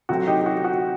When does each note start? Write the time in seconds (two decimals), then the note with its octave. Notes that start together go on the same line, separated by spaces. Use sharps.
0.09 C3 F#3 A3 C4 F#4
0.27 D#4 G4
0.41 G4
0.46 F#4
0.64 F#4